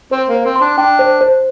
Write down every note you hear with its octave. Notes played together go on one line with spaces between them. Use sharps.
C4 C5
A#3
C5
C4
C6
D4
D4 G5
C5
C5